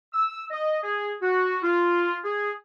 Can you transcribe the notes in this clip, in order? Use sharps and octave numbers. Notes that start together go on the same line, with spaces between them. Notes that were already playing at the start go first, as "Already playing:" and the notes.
E6
D#5
G#4
F#4
F4
G#4